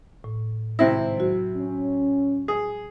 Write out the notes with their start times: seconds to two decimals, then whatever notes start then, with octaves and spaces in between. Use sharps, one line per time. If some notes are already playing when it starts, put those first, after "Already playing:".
0.24 A2
0.79 G#1 C3 C4 E4 C5 A#6
1.17 F#3 F#4
1.56 C#4
2.48 G#4